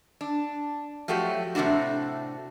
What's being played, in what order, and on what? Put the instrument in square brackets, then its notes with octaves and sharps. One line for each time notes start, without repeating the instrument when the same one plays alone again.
[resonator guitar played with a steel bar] D4
F3 F#3 A3 F#4 G4
A2 C3 G3 A3 D4 F#4